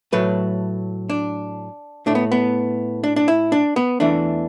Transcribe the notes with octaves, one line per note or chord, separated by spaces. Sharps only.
A2 F#3 A3 B4
D4
A2 A3 D4
B3
B3
D4
D4
E4
D4
B3
E2 E3 A3 D4